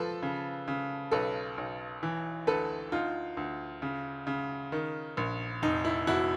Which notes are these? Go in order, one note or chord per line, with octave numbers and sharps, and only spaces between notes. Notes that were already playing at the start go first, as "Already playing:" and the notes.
Already playing: F3 A4 B4
C#3
C#3
B1 A4 B4
B1
E3
D2 A4 B4
D2 D#4 F4
D2
C#3
C#3
D#3
A#1
F1 D#4
E4
F1 E4 F#4